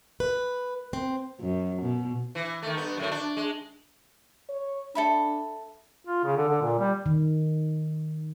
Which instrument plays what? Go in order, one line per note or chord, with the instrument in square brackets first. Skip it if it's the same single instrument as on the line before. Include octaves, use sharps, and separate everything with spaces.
[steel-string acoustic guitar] B4
C4
[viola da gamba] F#2
B2
[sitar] E3
D#3 A3
G2 B3
F#2 A2 D3
D4
G#3
[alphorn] C#5
[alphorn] D4 [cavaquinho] A4 E5 B5
[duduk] F4
C#3
D3
D3
A#2
G3
[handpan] D#3